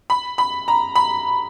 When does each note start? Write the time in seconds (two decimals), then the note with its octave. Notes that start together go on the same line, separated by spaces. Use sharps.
0.10 B5
0.38 B5
0.68 A#5
0.95 B5